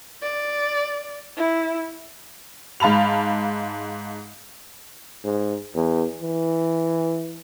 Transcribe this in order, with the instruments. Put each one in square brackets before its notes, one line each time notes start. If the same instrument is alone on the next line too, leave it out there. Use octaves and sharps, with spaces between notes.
[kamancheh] D5
E4
[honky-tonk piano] G#2 F5 A5 B5 F7
[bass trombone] G#2
E2
E3